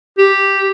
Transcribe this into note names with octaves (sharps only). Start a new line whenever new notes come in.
G4